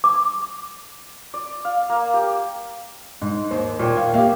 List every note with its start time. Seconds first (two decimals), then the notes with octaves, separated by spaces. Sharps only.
0.04 D6
1.34 D5
1.65 F5
1.89 A#3
2.14 G4
3.22 G#2
3.51 D#2 C5
3.79 A#2 C#5 G5
3.97 F5
4.14 A#3 G4 E5 F5